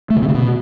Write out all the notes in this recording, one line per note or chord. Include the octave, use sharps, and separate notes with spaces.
A3
C#3
C3
C#3
B2